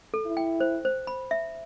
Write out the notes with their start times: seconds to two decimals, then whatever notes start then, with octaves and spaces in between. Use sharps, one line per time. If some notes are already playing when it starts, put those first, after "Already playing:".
0.14 A4
0.26 E4
0.37 G5
0.60 C5
0.85 C5
1.07 B5
1.31 E5